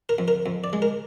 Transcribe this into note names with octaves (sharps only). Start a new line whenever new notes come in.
A#4
F2
A#4
F2
D5
G#3
A#4